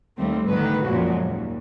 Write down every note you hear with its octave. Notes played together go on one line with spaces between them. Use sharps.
D#2 G3 A3 C4
D2 G#2 D3 D#3 B3 B4
F#2 A#2 C#3 F3 G#3 F#4
D#2